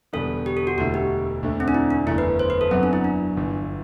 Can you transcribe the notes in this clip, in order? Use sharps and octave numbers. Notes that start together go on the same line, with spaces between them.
E1 E2 D3 G3 B3 A4
G4
A4
F#4
E1 D2 D3 A3 E4 F#4
G4
E1 D2 D3 A3
C4
D4
E4
D4
F#1 E2 D3 A3 E4
B4
C5
B4
A4
F#2 F#3 B3 C4 F#4
D4
E4
D4
G1 G2 E3